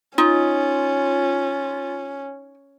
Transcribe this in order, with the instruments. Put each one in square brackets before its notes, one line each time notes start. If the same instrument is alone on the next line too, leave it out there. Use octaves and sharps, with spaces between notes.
[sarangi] C#4 [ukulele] D#4 [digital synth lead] F4